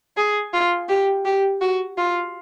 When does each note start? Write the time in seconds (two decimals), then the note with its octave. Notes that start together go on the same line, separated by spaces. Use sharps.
0.17 G#4
0.53 F4
0.89 G4
1.25 G4
1.61 F#4
1.98 F4